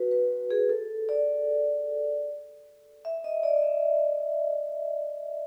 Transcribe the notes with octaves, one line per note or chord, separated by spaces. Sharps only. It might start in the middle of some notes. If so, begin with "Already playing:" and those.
Already playing: F#4 B4
B4
G#4
A4
D5
E5
D#5
D5
D#5
E5